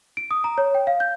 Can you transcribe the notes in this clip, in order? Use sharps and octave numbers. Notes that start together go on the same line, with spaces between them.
D7
D#6
A#5
C#5
G5
F5
G6